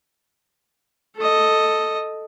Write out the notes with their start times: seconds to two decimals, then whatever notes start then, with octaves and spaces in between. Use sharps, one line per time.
1.17 A4 D#5